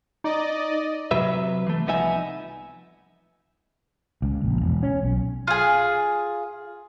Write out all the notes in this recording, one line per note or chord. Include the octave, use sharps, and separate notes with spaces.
D#4 D5 D#5
C3 F#3 B4 E5
E3 A3
C2 F3 B3 D#4 E5 G#5
C#2
A#1
E1
C#4
B1
F4 G#4